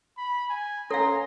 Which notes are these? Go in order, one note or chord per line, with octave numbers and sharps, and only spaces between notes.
B5
G#5
C#4 A4 F5 A#5 C6